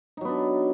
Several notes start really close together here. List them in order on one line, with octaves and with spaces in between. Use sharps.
D#4 F#3 B3 D4